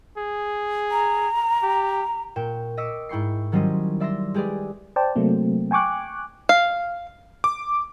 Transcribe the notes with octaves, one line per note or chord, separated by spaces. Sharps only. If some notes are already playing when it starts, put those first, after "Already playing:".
G#4
A#5
G4
A#2 G5 C#6 E7
D#5 C#6 D6 E6 B6
G#2 E4 G5 C#6 C7
D#3 F#3 G3 C#4 C5 D#5
D5 E5 C6 E6 A#6
G#3 G4 G#4 B4 D5
C5 D5 G5 A5
C3 F#3 A3 A#3 C4
G5 G#5 C#6 D6 F#6
F5
D6